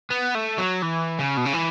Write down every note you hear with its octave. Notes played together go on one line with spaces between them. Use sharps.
B3
A3
F#3
E3
C#3
B2
C#3
E3